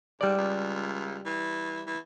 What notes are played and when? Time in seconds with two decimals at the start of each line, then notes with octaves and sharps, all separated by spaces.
0.21 G#2 G3 D5
0.37 C#2
1.26 E3
1.87 E3